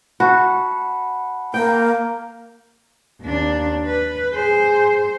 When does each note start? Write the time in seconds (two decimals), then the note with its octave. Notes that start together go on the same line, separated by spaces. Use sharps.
0.20 F#4 F#5 A5 B5
1.54 A#3 G5
3.22 D#2 D4
3.86 B4
4.34 G#4 C5